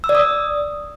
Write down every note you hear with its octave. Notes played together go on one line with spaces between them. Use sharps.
E6
D5
D#6